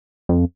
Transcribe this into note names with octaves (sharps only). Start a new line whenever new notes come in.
F2